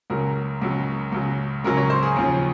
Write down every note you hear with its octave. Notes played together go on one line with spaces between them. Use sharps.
C#2 C#3 F#3 A#4
C#2 C#3 F#3
C#2 C#3 F#3
C#2 C#3 F#3 A#4
C#5
C5
G#4
D#2 C#3 F3